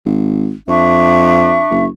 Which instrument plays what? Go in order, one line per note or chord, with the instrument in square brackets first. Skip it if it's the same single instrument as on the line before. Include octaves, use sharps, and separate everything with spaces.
[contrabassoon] G#1
[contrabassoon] F2 [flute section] D4 E5 C#6
[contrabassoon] F#1